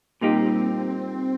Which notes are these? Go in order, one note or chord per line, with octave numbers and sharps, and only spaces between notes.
A#2 G3 A#3 C4 D#4 G4